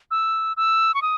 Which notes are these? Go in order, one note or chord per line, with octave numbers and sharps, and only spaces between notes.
E6
E6
C#6
D#6